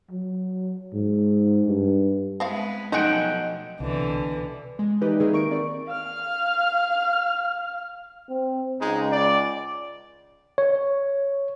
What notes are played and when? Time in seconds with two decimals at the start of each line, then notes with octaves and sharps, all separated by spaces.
0.11 F#3
0.93 G#2
1.68 G2
2.40 G#3 B3 C4 E4 F5
2.92 B1 F3 A3 C4 D#4 G#4 F#5 G5
3.80 C2 B2 D3 E3
4.79 G#3
5.01 E3 D#4 G4 B4 D5 D#5
5.20 D#3 A#3 C4 D#4 E4 G#4
5.32 D#4 A#4 C#6 D7
5.50 C4 D5
5.87 F5 F6
8.29 C4
8.81 C#2 G#3 D#4
9.11 D5
10.58 C#5